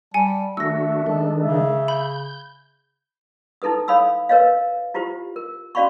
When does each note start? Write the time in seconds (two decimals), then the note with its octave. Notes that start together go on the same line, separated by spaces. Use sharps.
0.14 G3 G#5 A5 C#7
0.57 D#3 A3 D4 F#4 E5 E6 A#6
1.06 D#3 G#3 D4 A4
1.42 C#3 E5
1.88 B5 G6
3.62 D#4 E4 A4 B4 D#6
3.88 A4 C#5 F5 B5 D#6 E6
4.29 A#4 B4 C#5 D#5 F5
4.94 E4 F4 G4 C5
5.36 A#4
5.75 C#4 F#4 D5 F5 B5 C#6